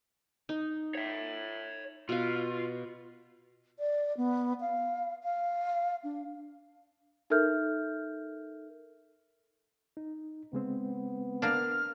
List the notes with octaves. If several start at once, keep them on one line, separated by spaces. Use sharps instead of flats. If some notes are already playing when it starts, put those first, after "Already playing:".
D#4
C#5 E5
B2 F4 F5
D5
B3
F5
F5
D4
D#4 A4 A#4 E5 F6 G6
D#4
C#3 G#3 B3 C4
A#3 D4 F6